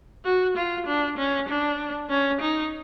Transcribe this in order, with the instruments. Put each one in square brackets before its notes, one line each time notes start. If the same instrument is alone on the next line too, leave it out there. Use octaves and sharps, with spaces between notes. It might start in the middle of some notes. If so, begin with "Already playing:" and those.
[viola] F#4
F4
D4
C#4
D4
C#4
D#4